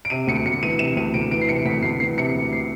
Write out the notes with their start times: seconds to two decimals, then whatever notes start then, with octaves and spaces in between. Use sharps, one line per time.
0.05 D7
0.10 C3 D#7
0.27 D2 C#7
0.46 D2 C#7
0.63 E3 D#7
0.79 C3 E7
0.96 D2 D#7
1.14 D2 D7
1.31 E3 D7
1.41 C7
1.49 C3 C#7
1.65 D2 B6
1.82 D2 C7
2.00 E3 C7
2.18 C3 C#7
2.35 D2
2.53 C7